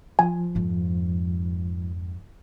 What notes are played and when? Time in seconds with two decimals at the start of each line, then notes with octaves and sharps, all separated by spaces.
0.19 F3 G#5
0.55 F2 G#2